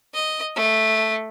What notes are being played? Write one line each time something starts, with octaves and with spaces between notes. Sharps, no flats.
D#5
A3